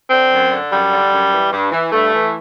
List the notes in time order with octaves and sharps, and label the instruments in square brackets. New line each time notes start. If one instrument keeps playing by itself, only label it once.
[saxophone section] D3 C4
F#2
D3
F#2 G3
D3
F#2
E3
G2
E3
G2 A3
E3